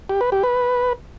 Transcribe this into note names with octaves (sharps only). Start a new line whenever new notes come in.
G4
B4
G4
B4